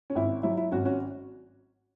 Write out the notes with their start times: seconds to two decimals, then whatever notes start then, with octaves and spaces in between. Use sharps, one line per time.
0.10 C#4
0.15 G#1 E4
0.43 F#3 E4
0.57 E4
0.71 G#1 C#4 F#4
0.85 C#4 F#4